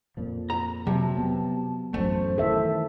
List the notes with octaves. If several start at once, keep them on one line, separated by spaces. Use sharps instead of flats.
F2 A#2 F3
A#5
C3 F#3 A5
B3
A1 F#2 A3 C5
D#3 E3 A4 E5